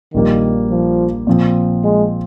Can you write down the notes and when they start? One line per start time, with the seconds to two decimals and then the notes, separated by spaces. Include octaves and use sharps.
0.13 A#1 A#2 D#3 G3 A#3
0.70 F3
1.27 A#2 F3 C4
1.84 G#3